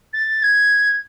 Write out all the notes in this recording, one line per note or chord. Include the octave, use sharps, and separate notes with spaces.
A6
G#6